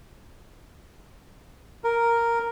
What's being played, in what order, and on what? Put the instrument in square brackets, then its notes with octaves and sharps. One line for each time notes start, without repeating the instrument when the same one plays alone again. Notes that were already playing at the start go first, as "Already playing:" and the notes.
[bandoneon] A#4